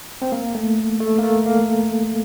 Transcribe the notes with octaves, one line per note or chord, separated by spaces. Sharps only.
C4
A#3
A3
A3
A#3
A3
A#3